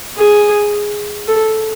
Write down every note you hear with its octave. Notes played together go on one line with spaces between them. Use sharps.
G#4
A4